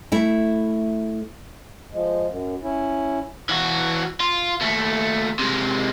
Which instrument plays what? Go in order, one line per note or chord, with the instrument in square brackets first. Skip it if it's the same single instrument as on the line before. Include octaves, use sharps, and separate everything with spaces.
[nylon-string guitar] A3 E4
[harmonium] F3 G#3
F#2
C#4 E4
[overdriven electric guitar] E3 F#4
F4
D#2 A3
C3 G#3